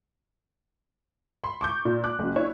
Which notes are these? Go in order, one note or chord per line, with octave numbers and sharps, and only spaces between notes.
B5 C6
C#6 D6 G6
A#2
D6 F#6
F#1 F#2
D4 E4 C#5